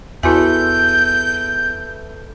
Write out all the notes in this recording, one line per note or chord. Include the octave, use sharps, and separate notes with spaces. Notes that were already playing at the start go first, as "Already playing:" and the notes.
E2 E4 F#4 A4 B4 E5 G#5 G6